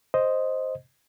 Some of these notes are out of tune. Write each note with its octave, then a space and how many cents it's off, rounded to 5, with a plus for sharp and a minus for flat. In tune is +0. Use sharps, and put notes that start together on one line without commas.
C5 +5 D#5 +0